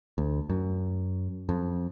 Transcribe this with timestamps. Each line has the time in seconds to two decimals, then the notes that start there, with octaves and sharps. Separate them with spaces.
0.18 D2
0.49 F#2
1.49 F2